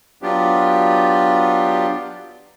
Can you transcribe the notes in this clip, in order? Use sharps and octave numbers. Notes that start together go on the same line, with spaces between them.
F#3 B3 D4 F4 G4